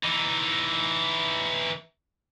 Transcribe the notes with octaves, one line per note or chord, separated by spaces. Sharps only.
E3 D#4